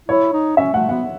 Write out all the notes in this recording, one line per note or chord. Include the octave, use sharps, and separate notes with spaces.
E4 C#5
D#4
C#4 E5
A3 F#5
B3 F#5